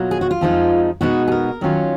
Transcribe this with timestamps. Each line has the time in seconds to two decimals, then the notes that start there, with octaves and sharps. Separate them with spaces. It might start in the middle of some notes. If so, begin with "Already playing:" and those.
Already playing: B2 F#3 A#3 F4
0.11 G#4
0.21 F#4
0.31 F4
0.41 F2 F3 G#3 D#4
1.01 B2 G#3 B3 D#4 F#4
1.28 G#4
1.32 A#4
1.61 D#3 F#3 C#4 F4